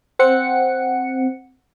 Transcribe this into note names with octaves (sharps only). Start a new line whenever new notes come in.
C4 F#5 C#7